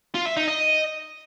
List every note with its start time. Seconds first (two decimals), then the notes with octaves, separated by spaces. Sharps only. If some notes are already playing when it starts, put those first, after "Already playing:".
0.15 F4
0.26 E5
0.37 D#4
0.48 D#5